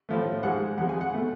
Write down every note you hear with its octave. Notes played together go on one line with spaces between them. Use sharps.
A2 F3 A3
G#2 F3 G#3 F#5
F2 F3 G#3 F#5
G#5
F#5
B2 A3